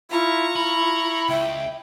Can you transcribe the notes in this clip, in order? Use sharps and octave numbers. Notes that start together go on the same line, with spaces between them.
E4 F4 A#5 C#6
E4 B5
C#2 E5 G5